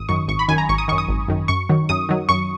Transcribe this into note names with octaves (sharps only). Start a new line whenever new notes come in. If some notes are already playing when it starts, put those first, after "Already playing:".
Already playing: G#1 D#6
F#2 D#3 C#6
G#1 C#6
B5
F#2 D#3 G#5
A#5
G#1 C#6
D#6
F#2 D#3 C#6
D#6
G#1
F#2 D#3
F#2 C#6
D#3 F#3
F#2 D#6
D#3 F#3
F#2 C#6